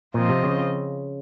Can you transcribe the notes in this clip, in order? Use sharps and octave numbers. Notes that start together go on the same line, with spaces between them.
A#2 F3 C4 F4 C5 D#5
C3
C#3